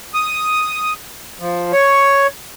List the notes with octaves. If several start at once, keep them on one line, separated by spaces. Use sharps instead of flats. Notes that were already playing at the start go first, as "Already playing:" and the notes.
D#6
F3
C#5